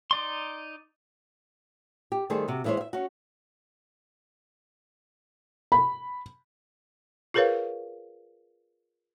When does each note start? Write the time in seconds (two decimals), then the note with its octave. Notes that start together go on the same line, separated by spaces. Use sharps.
0.11 D#4 D5 C6
2.12 G4
2.30 D#3 G3 A3 G#4 C5
2.48 C3 F#4
2.64 E3 G#3 E4 G#4 C5 C#5
2.77 E5 F5
2.93 C#4 F#4
5.72 B5
7.34 F4 G#4 A#4 B4 C#5 F5